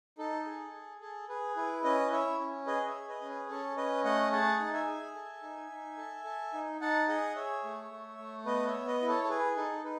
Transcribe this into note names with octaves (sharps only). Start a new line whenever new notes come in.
D#4 A4
G#4
G#4
G#4 A4
G#4 B4
E4 B4
C#4 B4 D#5
E4 C#5 E5
C#4
G#4 B4 D#5
C#5 E5
G#4
B4 D#5
C#4
B4
C#4 A4 C#5
C#4 B4 D#5
A3 D#5 F#5
G#4 F#5 A5
D#4
E5 G#5
G#4
A4
D#4
D#4
A4
A4
D#4
D#4 F#5 A5
G#4 D#5 F#5
G#4 C#5 E5
A3
A3
A3
B3 B4 D#5
C#5 E5
B3
B4 D#5
E4
A4 C#5
A4
G#4 B4
D#4 A4
D#4 B4